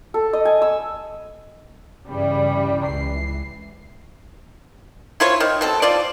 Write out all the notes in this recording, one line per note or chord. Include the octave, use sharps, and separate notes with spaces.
A4
D#5
G#5
E6
G2 C#3 E3 G3
C#2 E3 C7
E4 F4 C5 C#5
D#3
B2 C4 A4
F4 C5 D5